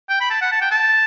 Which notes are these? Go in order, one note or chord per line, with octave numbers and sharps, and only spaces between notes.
G5
B5
A5
F#5
A5
G5
A5